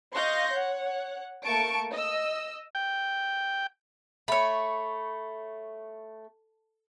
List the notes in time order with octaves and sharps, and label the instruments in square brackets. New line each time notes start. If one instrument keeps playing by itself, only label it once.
[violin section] D#5 F5 C6 C#6 G6 A#6
C#5 F#5
A3 A#3 A5 C#6 D7
D#5 E6
[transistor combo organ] G5
[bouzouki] A3 [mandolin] C#5 B5